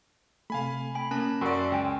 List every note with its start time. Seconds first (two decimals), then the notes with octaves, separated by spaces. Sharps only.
0.50 C3 A3 F5 G#5 B5
0.95 G#5 B5
1.11 A#3 C#4 A5
1.41 F#2 A#4 D5 F#5 G#5 C6 C#6 E6
1.72 C#2 G5 G#5